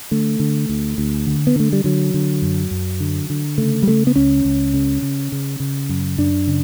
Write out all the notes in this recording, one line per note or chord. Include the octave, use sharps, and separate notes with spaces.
D3 A3
D3
D2
D2
D3
B3
D3 A3
G3
D3 F#3
D3
F#2
F#2
D3
D3
C#3 A3
G3
C#3 A3
B3
C#2 C#4
C#2
C#3
C#3
C#3
C#3
F#2
F#2 D4
C#3